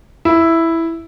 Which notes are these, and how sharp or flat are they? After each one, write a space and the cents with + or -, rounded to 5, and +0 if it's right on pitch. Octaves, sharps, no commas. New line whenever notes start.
E4 +0